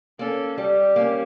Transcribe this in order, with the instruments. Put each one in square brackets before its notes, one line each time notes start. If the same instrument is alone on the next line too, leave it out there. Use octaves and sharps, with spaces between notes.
[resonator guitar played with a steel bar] A#3 C#4 [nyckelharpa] A4
[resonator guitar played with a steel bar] G3 [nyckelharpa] G4
[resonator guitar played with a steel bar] A#3 C#4